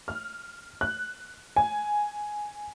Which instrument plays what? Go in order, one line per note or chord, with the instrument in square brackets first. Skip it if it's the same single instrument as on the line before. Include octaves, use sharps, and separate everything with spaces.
[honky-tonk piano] F6
F#6
G#5